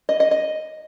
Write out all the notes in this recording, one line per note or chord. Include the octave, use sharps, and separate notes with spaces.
D#5
D#5
D#5